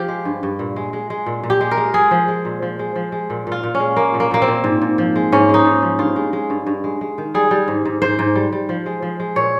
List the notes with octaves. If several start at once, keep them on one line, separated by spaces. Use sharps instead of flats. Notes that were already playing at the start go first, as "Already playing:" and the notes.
Already playing: F3 F4 G4
G#3
G2
G2
A#2
G#3
G#3
G#3
A#2
A#2
G4
G#3
A#4
G#3
G#3 G#4
F3
G#3
A#2
F3
G#3
F3
G#3
A#2
A#2 F4
A#2
C#4
G#3
G#3 A#3
A#2
A#3
A#2 A#3
C4
A#2
G#2
G#2
F3
G#3
G#2 C#4
G#3
D#4
G#2
F3
G2 F4
G#3
G#3
G2
G2
G#3
G#3
D#3
G3 G#4
G3
G#2
G#2
G#2 C5
G#2
G3
G3
F3
G#3
F3
G#3
A#2 C#5